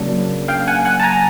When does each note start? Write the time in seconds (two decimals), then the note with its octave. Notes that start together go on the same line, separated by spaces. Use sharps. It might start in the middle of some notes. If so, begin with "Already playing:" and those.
Already playing: C#3 F#3 A#3 D4
0.48 F5 G5
0.68 F#5 G#5
0.85 F#5 G#5
1.00 A5
1.03 G#5 A#5